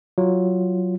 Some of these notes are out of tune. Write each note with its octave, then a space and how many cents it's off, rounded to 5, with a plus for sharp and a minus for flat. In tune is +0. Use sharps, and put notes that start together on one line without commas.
F#3 +0 F4 +0